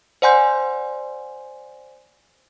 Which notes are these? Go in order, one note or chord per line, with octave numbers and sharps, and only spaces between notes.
C5 D5 F#5 G#5 C6 G6